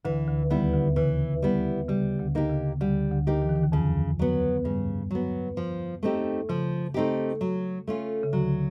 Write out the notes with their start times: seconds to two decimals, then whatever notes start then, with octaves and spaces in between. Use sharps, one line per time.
0.05 D2 D3 E3
0.28 D2 D3
0.50 D#2 D#3 G3 B3 E4
0.74 D2 D3
0.96 C#3 E3
1.42 G3 B3 E4
1.89 C#3 G3
2.19 D2 D3
2.35 A#3 D#4 G4
2.50 C#3
2.81 D2 D3 G3
3.12 D2 D3
3.27 A#3 D#4 G4
3.42 E3
3.49 D#3
3.56 D3
3.63 D#2 D#3
3.72 F2 C#3 F3
4.19 F#3 B3
4.65 G2 C#3 G3
5.11 F#3 B3
5.57 F3
6.03 A3 C4 D#4 G4
6.49 C#3 F3
6.94 A3 C4 D#4 G4
7.41 F#3
7.87 A3 C#4 F4
8.23 C#3
8.33 D2 D3 F#3